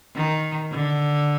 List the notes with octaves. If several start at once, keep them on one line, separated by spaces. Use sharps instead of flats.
D#3
D3